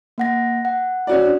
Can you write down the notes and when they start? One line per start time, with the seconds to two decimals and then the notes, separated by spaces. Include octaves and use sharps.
0.18 A#3 F#5 A#6
0.65 F#5
1.07 C#4 F#4 D5
1.26 D4